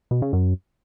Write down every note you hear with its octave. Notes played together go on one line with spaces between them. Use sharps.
B2
C#3
F#2